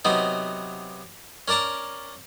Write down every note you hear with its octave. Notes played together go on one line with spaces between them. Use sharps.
C3 F#3 B3 D#4
C#4 A#4 D5 A5 A#5